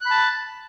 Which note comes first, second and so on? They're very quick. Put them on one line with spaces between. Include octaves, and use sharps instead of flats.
F#6 B5 A5